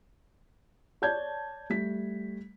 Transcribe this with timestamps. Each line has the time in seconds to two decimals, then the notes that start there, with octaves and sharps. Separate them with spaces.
1.02 C#5 D5 A5 G6 G#6
1.70 G3 A3 B6